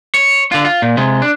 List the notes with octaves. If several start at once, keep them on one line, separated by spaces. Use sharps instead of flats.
C#5
D3 F4
F4
A#2
C3 G#3
D4